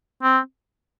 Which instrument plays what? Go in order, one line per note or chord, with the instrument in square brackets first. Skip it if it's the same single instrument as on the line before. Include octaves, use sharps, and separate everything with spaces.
[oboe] C4